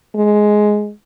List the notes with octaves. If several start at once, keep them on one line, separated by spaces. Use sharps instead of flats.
G#3